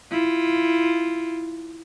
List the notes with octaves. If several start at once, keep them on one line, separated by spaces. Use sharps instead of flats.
E4 F4